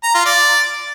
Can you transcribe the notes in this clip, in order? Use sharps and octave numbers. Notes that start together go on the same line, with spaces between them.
A#5
F4
D5